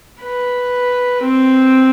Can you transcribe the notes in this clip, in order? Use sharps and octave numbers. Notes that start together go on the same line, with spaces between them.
B4
C4